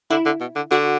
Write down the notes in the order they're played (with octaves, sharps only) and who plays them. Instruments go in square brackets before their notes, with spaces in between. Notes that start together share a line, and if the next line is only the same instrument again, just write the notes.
[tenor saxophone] D3 [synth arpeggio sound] E4
[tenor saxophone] D3
B2
D3
[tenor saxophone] D3 [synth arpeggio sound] F#4